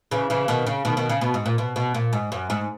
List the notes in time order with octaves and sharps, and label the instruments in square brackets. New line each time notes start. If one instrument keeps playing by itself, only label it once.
[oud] C#3 E3
C#3 E3
B2 D#3
C#3
B2 D#3
B2 D#3
C#3
B2
G#2
A#2
B2
B2
A#2
G#2
F#2
G#2